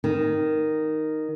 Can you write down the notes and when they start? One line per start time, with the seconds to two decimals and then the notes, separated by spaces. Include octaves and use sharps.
0.04 D#3